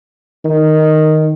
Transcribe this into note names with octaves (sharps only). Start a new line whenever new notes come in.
D#3